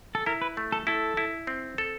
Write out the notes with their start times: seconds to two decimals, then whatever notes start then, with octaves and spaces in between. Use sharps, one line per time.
0.15 A4
0.26 E4 A#4
0.41 B4
0.57 A3
0.72 A4
0.87 E4 A4
1.17 E4
1.47 C4
1.78 A4